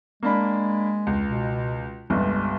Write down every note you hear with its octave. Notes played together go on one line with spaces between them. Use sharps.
G#3 A#3 D4 B5
C#2
B2
G1 C2 G2 G#3